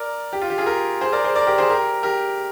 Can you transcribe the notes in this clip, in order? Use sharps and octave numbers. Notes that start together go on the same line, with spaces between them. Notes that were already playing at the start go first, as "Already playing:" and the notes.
Already playing: A#4 D5
G4
F4
G4
F4 G#4
G4 A#4
G#4 C5
A#4 D5
G#4 C5
A#4 D5
G4 A#4
G#4 C5
G4 A#4
G4 A#4